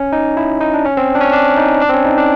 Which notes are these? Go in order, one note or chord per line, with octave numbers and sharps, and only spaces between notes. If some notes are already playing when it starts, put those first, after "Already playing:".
Already playing: C#4
D#4
E4
D#4
D4
C#4
C4
D4
C#4
D4
D#4
D4
C4
C#4
D#4
D4